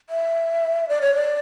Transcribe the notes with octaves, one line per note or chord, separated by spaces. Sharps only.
E5
D5
C#5
D5